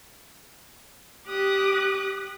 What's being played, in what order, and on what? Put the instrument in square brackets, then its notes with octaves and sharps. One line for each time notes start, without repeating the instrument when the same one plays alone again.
[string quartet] G4 D6 D#6 F#6